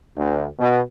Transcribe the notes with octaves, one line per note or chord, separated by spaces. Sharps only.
D2
B2